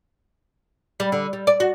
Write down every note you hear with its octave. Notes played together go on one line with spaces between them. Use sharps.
G3
D3
G3
D5
F#4